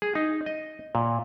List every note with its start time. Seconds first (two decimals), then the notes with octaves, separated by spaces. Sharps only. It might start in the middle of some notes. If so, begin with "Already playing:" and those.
0.02 G#4
0.15 D#4
0.46 D#5
0.95 A#2